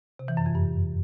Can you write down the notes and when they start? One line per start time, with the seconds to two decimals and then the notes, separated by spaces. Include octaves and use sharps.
0.19 C3
0.28 E3
0.37 F#2
0.46 F2
0.55 G2